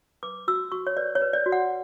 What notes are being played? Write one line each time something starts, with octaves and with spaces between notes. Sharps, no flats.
B4 D6
F#4 E6
F#4 C#6
C#5
B4 D5
C#5
B4
D5
F#4
F#5